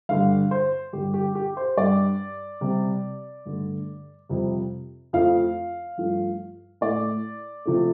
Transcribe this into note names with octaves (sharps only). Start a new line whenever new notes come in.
G2 D3 G3 F5
C5
G2 D3 G3 G4
G4
G4
C5
G2 G3 D5
C3 G3
G2 D3 A3
F2 C3 G3
F2 F3 A3 F5
G2 F3 A3
A2 A3 D5
C3 F3 A3